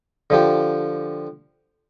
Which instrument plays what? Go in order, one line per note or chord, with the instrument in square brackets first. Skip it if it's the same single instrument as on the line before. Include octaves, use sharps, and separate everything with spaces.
[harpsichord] D3 F3 G4